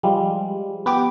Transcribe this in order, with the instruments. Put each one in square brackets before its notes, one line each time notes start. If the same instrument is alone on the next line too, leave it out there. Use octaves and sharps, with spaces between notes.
[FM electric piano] F3 G3 G#3
B3 G4 D6